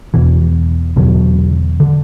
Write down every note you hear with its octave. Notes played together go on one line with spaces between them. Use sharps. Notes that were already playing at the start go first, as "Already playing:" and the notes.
E2 B2 E3
E2 B2 D3 F#3
D3